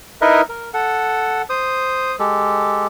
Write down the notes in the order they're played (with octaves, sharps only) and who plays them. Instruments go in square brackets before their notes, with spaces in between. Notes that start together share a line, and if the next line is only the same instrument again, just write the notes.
[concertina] D#4 E4 A#4 B4 D#5 E5
A#4
A4 F#5
C5 D#6
G#3 G4 A4